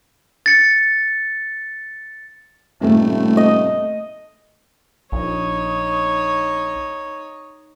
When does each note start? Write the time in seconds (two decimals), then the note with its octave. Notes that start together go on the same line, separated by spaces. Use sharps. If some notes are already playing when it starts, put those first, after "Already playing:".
0.46 A6 C#7
2.81 D#1 A2 C3 A3
3.37 D#5
5.12 A#1 D#4 C#5